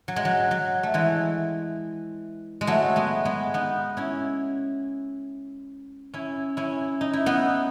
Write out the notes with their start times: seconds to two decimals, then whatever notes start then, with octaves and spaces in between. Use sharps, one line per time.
0.08 F#3
0.16 G#3
0.25 F#3
0.51 F#3
0.83 A3
0.94 E3 G#3
2.61 G#3
2.67 F#3 A3
2.96 G#3 B3
3.25 G#3 B3
3.54 B3 D#4
3.97 C#4 E4
6.14 C#4 E4
6.57 C#4 E4
7.01 D#4
7.13 E4
7.26 B3 D#4